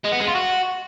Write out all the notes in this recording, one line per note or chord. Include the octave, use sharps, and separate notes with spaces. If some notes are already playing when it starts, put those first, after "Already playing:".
G#3
B3
G#3
F4
F#4